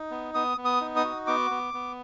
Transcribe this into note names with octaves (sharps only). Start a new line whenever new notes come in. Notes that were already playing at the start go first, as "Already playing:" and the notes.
Already playing: D#4
B3
B3 D#6
B3
D#6
D#4
D#6
F#4
B3 D6
B3
B3